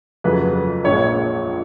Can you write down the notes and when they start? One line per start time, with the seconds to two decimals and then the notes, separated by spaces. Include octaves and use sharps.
0.24 F2 C#3 F#3 B4
0.84 A#1 A#2 G#3 C#5
0.95 C#5